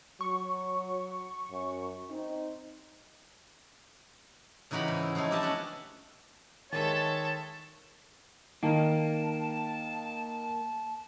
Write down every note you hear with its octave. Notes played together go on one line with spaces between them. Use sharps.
F#3 C#6
F#2
C4 D#4
C#3 E3 D#4 F#4 G4 B5
G#2 G5
E4
F3 A3 C#4 D#4 E4
D4 G4 A4 D#5 E5 A5
B3 C#4 F#5
D#3 G#3 A4 C#5 E5 A5
D#3 A#3 A5